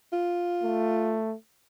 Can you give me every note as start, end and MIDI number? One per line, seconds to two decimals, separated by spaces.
0.13 1.19 65
0.63 1.35 57